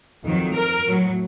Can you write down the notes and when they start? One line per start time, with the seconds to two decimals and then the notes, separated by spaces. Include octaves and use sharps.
0.24 F2 D#3 F#3
0.54 A#4
0.86 A2 F#3